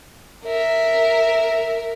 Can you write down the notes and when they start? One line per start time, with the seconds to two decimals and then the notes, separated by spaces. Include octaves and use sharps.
0.45 A#4 E5